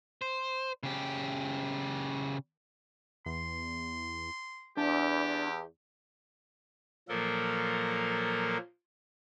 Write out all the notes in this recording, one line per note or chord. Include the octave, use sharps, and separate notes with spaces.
C5
C#3 G4
E2 C6
E2 D4 G4
A#2 F3 F#3 A#3 A4 A#4